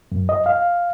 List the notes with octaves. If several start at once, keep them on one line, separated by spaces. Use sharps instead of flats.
F#2
D#5
F5